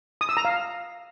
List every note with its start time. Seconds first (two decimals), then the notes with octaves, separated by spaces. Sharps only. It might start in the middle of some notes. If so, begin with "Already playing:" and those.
0.21 D#6
0.29 E6
0.37 A#5
0.45 F5